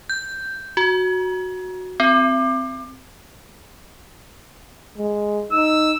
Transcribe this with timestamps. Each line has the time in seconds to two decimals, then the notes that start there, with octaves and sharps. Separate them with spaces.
0.10 G6
0.77 F#4
2.00 C4
4.98 G#3
5.52 D#4 E6